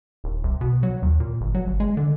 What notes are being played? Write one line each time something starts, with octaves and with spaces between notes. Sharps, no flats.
D#1
C2
B2
F#3
D#2
A#2
G1
F#3
G1
G#3
D3